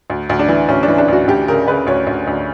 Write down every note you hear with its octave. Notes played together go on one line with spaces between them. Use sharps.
D2
D2
D4
E3
D2 C#4
D4
E3
D4
D2 F#4
D2 G4
C#3 A#4
C#3 B4
D2 C#5
D2
D2